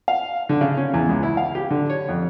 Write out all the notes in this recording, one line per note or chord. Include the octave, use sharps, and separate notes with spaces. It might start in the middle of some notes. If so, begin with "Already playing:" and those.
F5
D3
C#3
C#4
E2
C#2
E4
F5
G4
D3
C#5
F2